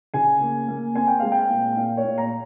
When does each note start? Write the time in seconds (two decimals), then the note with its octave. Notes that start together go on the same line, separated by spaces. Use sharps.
0.14 C#3 G#5
0.41 A#3
0.68 A#3
0.95 C4 G#5
1.07 G5
1.20 G#3 F5
1.32 G5
1.50 A#2
1.77 A#2 F5
1.97 C#5
2.04 A#2
2.18 A#5